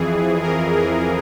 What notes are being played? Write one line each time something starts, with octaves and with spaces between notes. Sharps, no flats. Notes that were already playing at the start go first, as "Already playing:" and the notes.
Already playing: F2 E3 G#4
A#4
G#4